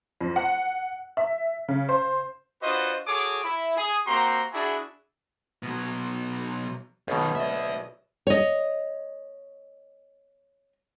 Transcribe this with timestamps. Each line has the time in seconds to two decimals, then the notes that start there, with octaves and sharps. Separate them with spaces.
0.21 F2
0.36 F#5
1.17 E5
1.68 C#3
1.89 C5
2.62 D4 F4 F#4 B4 C5 D#5
3.07 F#4 G#4 A4 C#5 D6
3.43 E4
3.77 G#4
4.06 A#3 C4 F#4 G4 A#5 C6
4.53 D4 E4 F#4 G#4
5.63 B2 F#3
7.08 B1 F#2 B2 D#3
7.35 D5 E5
8.27 C#5 D#5